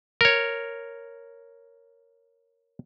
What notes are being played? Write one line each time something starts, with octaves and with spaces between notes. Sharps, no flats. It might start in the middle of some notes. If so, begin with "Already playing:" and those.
A#4 C#5